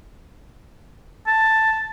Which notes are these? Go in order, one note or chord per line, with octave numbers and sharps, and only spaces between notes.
A5